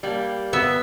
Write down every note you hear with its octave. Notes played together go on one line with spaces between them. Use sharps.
G3 A#3
B3 E5